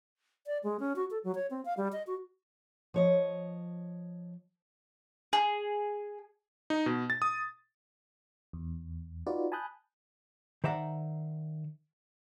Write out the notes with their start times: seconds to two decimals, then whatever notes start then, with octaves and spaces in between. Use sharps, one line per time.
0.47 D5
0.64 G#3
0.80 C#4
0.96 F#4
1.11 A4
1.24 F#3
1.35 C#5
1.50 C4
1.65 F5
1.77 G3
1.92 D#5
2.07 F#4
2.94 F3 C#5 D#5
5.33 G#4
6.70 D#4
6.86 B2
7.10 A6
7.22 D#6
8.53 E2
9.26 D#4 F4 F#4 B4 D5
9.52 G#5 A5 B5 D#6 F#6 G6
10.64 D#3 C5 D5 E5 F#5 A#5